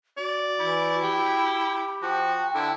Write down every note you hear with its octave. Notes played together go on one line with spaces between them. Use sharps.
F#4 D5
E3 E4
G4 G5
F3 F#4 G5
D3 E4